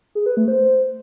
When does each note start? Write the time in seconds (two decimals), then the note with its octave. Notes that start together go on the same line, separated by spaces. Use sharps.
0.15 G#4
0.26 B4
0.37 A3
0.48 C5